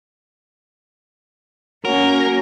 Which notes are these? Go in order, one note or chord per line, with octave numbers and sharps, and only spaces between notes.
F#3 A#3 C#4 A#4